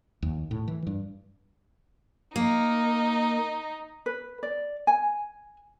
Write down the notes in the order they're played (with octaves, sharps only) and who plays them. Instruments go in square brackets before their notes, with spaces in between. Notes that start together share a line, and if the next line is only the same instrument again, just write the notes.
[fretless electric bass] D#2
A2
E3
G2
[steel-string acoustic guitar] A#3 [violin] D#4
[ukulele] B4
D5
G#5